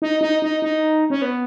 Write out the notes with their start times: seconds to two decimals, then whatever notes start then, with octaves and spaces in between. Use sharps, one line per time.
0.02 D#4
0.21 D#4
0.42 D#4
0.62 D#4
1.10 C#4
1.22 B3